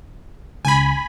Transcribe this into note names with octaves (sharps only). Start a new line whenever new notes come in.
C#2 G#5 B5